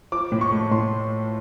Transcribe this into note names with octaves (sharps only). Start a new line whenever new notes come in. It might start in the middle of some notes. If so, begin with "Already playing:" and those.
F3 D6
A2
C#6
A3
A2 C6